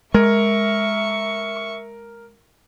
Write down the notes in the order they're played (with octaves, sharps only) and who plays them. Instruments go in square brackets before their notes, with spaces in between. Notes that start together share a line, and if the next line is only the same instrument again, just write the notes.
[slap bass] G#3 [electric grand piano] A#4 [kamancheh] E5 C#6